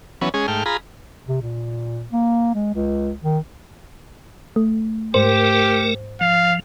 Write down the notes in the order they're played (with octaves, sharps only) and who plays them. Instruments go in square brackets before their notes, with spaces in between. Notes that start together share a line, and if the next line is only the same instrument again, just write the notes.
[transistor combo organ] E3 F#3 B3 C#4
G#3 C#4 G#4
G#2 A3 G5 F6
F4 G#4 A#5 B5
[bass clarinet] C3
A#2
A#3
G#3
C#2
D#3
[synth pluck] A3
[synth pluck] G#2 C5 [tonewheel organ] A3 A#4 [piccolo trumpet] G4
[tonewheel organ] F3 [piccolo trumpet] F5